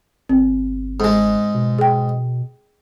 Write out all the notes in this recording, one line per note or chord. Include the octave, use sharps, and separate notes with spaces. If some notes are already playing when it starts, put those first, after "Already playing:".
G1 C4
G#2 G#3
B2
G#4 G5